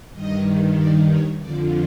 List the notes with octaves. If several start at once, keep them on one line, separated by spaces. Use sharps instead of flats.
G2 D#3 D#5
D5
C#5
F2 D3 F3 D5